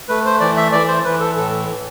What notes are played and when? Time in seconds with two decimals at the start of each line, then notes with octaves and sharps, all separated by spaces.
0.09 A3 B4
0.25 C5
0.40 E3 D5
0.57 E5
0.72 E3 D5
0.88 C5
1.05 E3 B4
1.20 A4
1.36 A2 A4